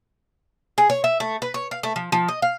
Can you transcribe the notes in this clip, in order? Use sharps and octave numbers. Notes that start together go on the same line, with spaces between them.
G#4
C#5
E5
A3
B4
C#5
F5
A3
F3
F3
D#5
F5